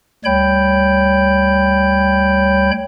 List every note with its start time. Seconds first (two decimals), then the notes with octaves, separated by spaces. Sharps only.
0.25 D2 G3 C#5 G5 B5 G6